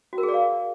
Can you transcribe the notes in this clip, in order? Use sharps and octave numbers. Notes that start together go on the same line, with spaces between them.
F#4
A#4
G#4
D5
F5